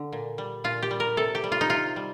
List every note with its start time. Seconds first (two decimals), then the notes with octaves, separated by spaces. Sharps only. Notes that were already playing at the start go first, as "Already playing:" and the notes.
Already playing: D3
0.13 A#2
0.38 G3
0.64 A#2 F4
0.83 G4
0.91 G3
1.00 A#4
1.17 C3 A4
1.35 G4
1.44 G3
1.52 F4
1.61 D#4
1.70 C3 F4
1.96 G3